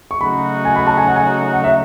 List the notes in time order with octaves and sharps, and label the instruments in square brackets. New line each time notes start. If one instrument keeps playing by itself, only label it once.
[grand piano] C#6
[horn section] C#3 F#3 A3 D#4 F#4 [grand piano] B5
[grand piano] G#5
B5
A5
G#5
F#5
G#5
F#5
E5